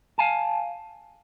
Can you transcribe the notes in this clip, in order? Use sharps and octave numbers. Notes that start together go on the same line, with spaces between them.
F5 G#5 A5